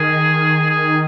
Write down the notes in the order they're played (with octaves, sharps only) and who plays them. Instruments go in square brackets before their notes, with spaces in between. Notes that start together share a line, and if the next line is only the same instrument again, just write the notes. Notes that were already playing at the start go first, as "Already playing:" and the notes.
Already playing: [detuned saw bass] D#3 [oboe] G#4
[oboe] G#4